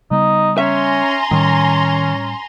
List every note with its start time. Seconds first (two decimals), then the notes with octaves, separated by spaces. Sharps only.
0.11 C#3 G3 B3 D#4
0.58 C#4 E5 G#5 A#5 C6
1.31 A2 D#3 G3 C#4